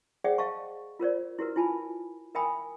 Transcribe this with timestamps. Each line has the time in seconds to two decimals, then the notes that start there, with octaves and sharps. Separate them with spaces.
0.24 G#4 C5 D5 E5 F#5 G5
0.38 D#5 F5 A5 C#6
0.99 F4 A#4 C5 D5
1.39 E4 F#4 A#4 B4
1.56 E4 F4 G#5 A5 B5
2.35 A#4 E5 G5 G#5 B5 D#6